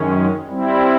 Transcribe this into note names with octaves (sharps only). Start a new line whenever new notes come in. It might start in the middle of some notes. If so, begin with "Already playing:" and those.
Already playing: F#2 D#3 G#3 C#4
G3 C4 E4